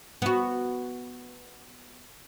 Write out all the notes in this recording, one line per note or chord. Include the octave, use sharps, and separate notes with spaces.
B3 F#4